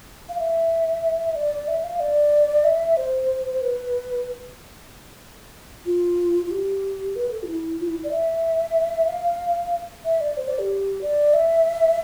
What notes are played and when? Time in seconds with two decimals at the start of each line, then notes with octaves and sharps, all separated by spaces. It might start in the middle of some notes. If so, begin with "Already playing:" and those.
0.29 F5
0.39 E5
1.35 D5
1.68 E5
1.84 F5
2.00 D5
2.64 E5
2.97 C5
3.61 B4
5.86 F4
6.46 F4
6.51 G4
7.16 B4
7.31 A4
7.43 F4
7.47 E4
7.80 F4
7.87 E4
8.04 D5
8.11 E5
9.08 F5
10.05 E5
10.21 D5
10.37 C5
10.48 D5
10.59 G4
11.02 D5
11.34 E5